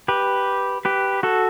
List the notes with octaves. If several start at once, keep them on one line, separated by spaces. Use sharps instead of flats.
G4 B4
G4 B4
F#4 A4